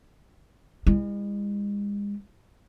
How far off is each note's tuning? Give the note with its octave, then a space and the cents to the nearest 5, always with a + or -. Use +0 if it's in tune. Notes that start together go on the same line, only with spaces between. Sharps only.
G#3 -40 E4 +0